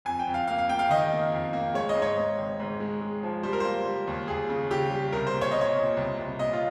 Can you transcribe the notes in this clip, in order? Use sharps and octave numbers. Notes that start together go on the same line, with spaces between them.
F2 G#5
G5
F2
F5
A#3 F5
F5
A#3 G5
F5
D#3 D#5
A#3
F2
A#3
G#3 C#5
D#5
G#2
C#5
G#2
G#1
G#2
G#3
G#3
F3
G3 C5
A#4
A#3 C5
G3
D#2
D#2 G#4
C#3
C#3 G4
G3
C2 A#4
C5
A#2
C#5
A#2 D#5
C#5
A#2
C2
C2
A#2 D#5
F4